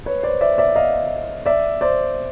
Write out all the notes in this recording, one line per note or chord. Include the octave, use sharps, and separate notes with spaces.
B4 C#5
C5 D5
D5 E5
D5 E5
D#5 F5
D5 E5
C5 D5